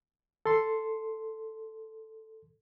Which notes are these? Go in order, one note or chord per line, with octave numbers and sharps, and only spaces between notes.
A4 C6